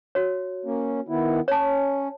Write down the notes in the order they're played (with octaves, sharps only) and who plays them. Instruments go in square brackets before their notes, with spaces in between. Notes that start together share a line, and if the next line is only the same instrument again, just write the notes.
[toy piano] F#4 C#5
[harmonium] A#3 C#4
D#3 B3 E4
[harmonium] C#4 [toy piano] C#5 A5